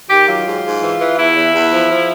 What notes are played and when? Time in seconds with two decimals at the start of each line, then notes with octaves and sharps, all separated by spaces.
0.09 D#3 G4
0.28 F#3 F4
0.46 G#2
0.64 G#2
0.82 E3
1.00 E3
1.17 E2 E4
1.36 E2
1.53 E2
1.72 F3
1.90 F3